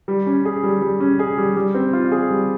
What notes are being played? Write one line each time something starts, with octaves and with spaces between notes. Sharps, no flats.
G3
C#4
G#4
G3
G3
C#4
G#4
G3
G3
C4
F4
G#4
G3